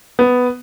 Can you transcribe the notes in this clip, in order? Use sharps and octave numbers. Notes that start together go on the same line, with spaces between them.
B3